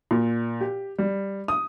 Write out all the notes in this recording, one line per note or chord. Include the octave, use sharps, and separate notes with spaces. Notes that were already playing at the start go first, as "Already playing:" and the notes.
A#2
G4
G3
D#6